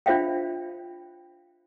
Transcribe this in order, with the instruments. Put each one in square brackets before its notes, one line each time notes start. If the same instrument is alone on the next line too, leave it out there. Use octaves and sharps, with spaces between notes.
[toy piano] D4 F4 C5 E5 F5 G5